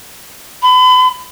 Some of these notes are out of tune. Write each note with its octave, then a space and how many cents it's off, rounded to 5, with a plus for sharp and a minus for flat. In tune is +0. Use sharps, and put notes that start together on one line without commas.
B5 +35